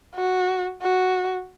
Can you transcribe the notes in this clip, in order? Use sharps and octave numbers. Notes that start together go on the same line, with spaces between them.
F#4
F#4